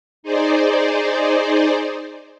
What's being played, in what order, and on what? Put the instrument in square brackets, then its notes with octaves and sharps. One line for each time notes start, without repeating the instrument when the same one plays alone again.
[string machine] D#4 G#4 C5 D5